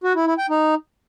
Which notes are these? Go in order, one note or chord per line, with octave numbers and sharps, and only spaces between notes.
F#4
E4
E4
G5
D#4